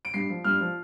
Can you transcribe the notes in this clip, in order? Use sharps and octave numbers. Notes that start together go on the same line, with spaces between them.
D7
G2 C7
F3
G2 F6
F3